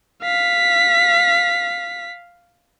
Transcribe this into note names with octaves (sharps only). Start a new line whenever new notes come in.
F5 B6